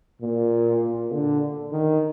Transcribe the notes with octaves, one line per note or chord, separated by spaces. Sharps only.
A#2
A#2
D3
D#3